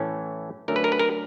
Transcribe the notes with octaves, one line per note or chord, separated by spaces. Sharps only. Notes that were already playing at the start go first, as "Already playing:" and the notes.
Already playing: A2 E3 A3 C#4
D3 F#3 A3 C#4 A#4
B4
A#4
B4
A#4